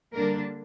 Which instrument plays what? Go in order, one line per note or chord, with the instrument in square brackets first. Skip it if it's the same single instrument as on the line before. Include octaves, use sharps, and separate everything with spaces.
[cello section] D3 G3 A#3 D4 A#4